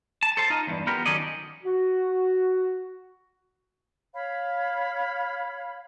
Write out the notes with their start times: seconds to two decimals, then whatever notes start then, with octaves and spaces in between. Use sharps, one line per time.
0.23 A5
0.37 A4 C5 A5
0.50 D#4 F4 D#5
0.67 E2 G2
0.87 B3 F4 G4 A#4
1.06 D#3 F#3 C#4 A4 D5 D#5
1.64 F#4
4.14 C#5 F5 B5